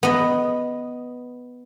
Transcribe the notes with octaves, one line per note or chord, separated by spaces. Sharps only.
B3 D#5